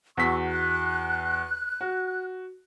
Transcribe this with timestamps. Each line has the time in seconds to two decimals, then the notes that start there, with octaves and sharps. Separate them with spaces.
0.17 E2 F#4 C#6 E6 B6
0.46 F#6
1.81 F#4